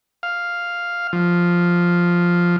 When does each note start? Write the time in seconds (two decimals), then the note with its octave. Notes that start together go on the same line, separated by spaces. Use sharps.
0.23 F5
1.13 F3